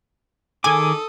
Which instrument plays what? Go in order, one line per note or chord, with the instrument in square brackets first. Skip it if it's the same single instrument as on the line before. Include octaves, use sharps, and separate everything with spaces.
[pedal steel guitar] D#3 G#4 D6 [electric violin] A4 D#6 [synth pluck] G#5